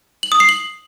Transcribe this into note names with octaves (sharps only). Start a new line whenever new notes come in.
F#7
D#6
C7
F#7